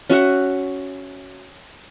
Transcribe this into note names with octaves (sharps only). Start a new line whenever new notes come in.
C#4 F#4 E5 F#5